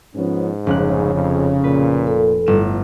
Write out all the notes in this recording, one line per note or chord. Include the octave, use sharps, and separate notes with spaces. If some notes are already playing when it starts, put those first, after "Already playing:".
G#2 F3 B3 C#4
F1 C#3 F#6
F2
A#2 B4
A4
G1 A2 E7